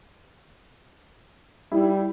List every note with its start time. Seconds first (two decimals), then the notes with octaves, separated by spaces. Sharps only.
1.72 G3 E4